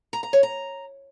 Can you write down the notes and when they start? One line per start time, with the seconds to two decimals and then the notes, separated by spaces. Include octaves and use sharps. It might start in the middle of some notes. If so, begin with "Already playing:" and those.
0.13 A#5
0.23 A#5
0.33 C#5
0.43 A#5